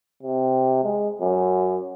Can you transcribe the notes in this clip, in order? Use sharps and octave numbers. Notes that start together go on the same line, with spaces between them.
C3
G#3
F#2